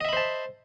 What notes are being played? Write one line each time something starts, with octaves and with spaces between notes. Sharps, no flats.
C5 D#5 E5 A5 B5